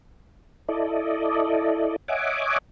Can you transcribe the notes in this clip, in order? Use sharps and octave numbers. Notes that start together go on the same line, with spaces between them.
E4 A4 D5 D#5
C#5 D#5 E5 F#5 G#5 D6